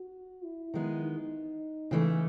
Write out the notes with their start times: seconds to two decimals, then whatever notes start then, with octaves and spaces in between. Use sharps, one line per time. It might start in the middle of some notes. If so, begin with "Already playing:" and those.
Already playing: F#4
0.44 E4
0.74 D#3 G#3 B3
1.04 D#4
1.91 C#3 E3 A3